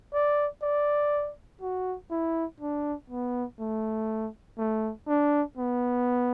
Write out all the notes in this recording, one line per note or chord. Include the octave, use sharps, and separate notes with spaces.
D5
D5
F#4
E4
D4
B3
A3
A3
D4
B3